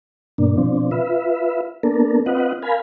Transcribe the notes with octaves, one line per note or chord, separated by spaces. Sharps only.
G2 B2 A#3 D4
B2 F3 C4 D4
F4 B4 E5
A#3 B3 D4 A4 A#4
C4 F4 B4 D#5 F#5
A#4 F5 G#5 B5